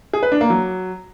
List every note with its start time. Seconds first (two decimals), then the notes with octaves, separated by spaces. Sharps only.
0.13 G#4
0.23 B4
0.32 D4
0.41 A#3
0.50 F#3